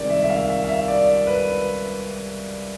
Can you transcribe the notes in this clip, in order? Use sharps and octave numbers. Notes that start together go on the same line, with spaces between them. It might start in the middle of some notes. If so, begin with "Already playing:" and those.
Already playing: C2 C3 D#3 G#3 D5
E5
E5
F5
E5
F5
E5
D5
B4